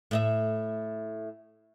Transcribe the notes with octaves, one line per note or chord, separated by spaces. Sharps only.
A2 D#5 E5